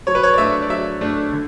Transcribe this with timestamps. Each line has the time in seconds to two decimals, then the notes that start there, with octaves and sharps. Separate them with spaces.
0.07 F#3 C#5
0.15 B4
0.23 C#5
0.33 D5
0.38 A3 D4 E5
0.62 D5
0.69 F#3 E5
1.01 A3 D4
1.33 D3